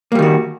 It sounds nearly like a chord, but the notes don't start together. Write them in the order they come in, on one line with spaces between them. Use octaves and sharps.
A#3 G3 D#3 F#4